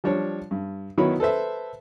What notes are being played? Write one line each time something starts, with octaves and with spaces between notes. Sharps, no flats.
F3 G3 D4 C#5
G2
D#3 F#3 B3 E4 C#5 B5
A4 B4 C5 E5